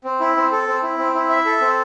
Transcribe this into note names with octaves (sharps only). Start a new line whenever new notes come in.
C4
E4
C4
A4
C4
E4
C4
E4
E5
A4
C4